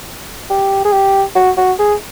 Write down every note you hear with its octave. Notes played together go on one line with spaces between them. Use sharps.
G4
G#4
G4
F#4
F#4
G#4